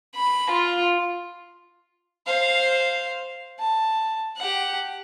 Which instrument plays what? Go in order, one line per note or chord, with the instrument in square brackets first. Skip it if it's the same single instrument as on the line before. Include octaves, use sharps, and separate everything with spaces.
[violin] B5
F4
[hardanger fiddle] C5 F5
A5
G4 F#5